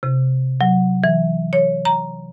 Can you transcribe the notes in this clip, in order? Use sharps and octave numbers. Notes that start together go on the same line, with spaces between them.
C3
F#3
E3
C#5
A#5